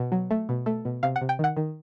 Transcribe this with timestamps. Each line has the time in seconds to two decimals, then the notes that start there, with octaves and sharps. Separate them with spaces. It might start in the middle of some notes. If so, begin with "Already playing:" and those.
Already playing: B2
0.12 F#3
0.31 A3
0.49 B2
0.66 A3
0.85 B2
1.03 C3 F5
1.16 F#5
1.21 C3
1.29 G5
1.39 D#3 F#5
1.56 D#3